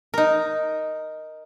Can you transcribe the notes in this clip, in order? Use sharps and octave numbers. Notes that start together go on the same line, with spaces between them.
D#4 A#4